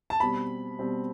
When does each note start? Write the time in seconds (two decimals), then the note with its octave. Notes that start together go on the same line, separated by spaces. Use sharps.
0.10 A5
0.20 B2 G3 C4 B5
0.79 B2 G3 C4